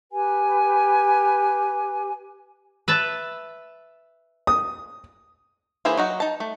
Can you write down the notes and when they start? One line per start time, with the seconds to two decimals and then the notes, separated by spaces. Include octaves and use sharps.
0.12 G4 B4 G#5
2.88 B4 E5 A5
4.47 D#6
5.85 E3 A#3 E4 G#4 C5
5.97 F#3 D#4 F#4
6.20 D#4 A5
6.40 A3